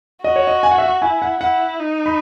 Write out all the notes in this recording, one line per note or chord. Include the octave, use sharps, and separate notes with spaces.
F#4 D#5
C#5
D#5
G#5
F#5
E5
F#5
E4 G#5
F#5
E4 F#5
D#4
B5